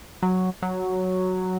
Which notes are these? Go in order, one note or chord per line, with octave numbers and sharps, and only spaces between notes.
F#3
F#3